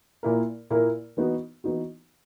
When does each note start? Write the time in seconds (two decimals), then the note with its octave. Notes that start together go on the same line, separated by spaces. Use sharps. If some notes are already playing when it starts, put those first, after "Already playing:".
0.23 A#2 A#3 E4 A#4
0.70 A#2 A#3 E4 A#4
1.17 E3 B3 D#4 F#4
1.64 E3 B3 D#4 F#4